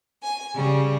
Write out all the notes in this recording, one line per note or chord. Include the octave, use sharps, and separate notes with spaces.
G#5
C#3 G3